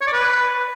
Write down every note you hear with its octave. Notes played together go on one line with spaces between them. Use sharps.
C#5
D5
B4